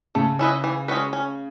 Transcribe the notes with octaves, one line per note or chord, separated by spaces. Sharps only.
C#3 A3
C#4 E4 B4 D#5
E3
G#3 C#4 F#4 B4
C#4